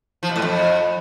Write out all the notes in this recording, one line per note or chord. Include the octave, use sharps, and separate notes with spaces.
F3
B2
A2
F2